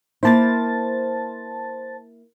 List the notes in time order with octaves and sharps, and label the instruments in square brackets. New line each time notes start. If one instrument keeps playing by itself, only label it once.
[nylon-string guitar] A#3 E4 [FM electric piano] C5 A5 A6